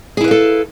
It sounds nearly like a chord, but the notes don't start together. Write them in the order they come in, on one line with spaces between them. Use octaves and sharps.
G#4 E4 B4 F5 A4